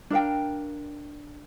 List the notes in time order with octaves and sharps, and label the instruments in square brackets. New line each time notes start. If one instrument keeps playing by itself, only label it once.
[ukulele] D4 A#4 F5 G5